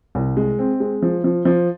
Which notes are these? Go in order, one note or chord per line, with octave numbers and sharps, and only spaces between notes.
C2
G#3
C4
G#3
F3
F3
F3